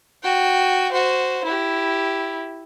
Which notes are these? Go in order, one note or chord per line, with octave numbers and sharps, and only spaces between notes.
F#4 G5
F#4 C5
E4 G4